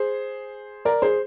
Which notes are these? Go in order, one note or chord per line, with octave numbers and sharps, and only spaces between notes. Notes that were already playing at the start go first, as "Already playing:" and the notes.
Already playing: G#4 C5
A#4 D5
G#4 C5